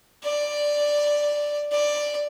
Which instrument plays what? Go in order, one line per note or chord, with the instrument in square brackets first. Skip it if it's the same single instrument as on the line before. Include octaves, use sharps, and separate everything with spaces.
[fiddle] D5
D5